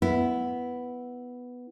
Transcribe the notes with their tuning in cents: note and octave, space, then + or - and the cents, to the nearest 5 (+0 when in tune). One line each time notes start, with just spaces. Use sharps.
B3 +0 E4 +0